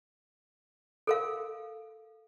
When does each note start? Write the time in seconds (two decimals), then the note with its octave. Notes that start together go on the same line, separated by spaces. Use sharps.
1.07 A4 A#4 F5